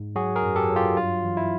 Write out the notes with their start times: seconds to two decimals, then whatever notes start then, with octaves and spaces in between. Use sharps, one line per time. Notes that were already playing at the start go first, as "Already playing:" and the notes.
Already playing: G#2
0.16 F#3 F#4 G#4
0.36 G#4 A#4
0.43 F#2
0.56 G4 A4
0.70 F#3
0.76 F4 G4
0.96 G2 F4
1.23 E3
1.37 E4